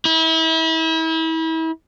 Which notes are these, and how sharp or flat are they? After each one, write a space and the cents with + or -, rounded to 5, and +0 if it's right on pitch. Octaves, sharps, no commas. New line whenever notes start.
E4 -35